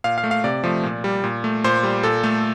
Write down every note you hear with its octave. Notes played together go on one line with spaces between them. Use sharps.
A#2 F5
F5
A3
F5
C3 D5
F3 A3
A#2
G3
A#2
A3
A#2 C5
G3
A#2 A4
A3